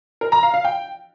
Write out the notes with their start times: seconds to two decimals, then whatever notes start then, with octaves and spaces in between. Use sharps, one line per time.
0.21 A#4
0.32 A#5
0.43 F5
0.54 F5
0.65 G5